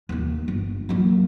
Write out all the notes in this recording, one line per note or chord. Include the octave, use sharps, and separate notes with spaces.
D#2 A#3
G1
F#3 A#3